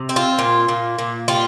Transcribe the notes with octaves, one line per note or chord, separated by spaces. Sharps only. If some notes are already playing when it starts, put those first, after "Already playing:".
Already playing: C3
C4
F4
A#2
A#2
A#2
G3 F4